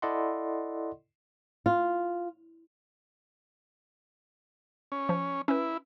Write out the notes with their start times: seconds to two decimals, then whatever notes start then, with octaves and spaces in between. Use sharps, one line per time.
0.02 E4 A4 D5 D#5 F#5 C6
1.66 F4
4.92 C#4
5.09 F3
5.48 C#4 E4 B4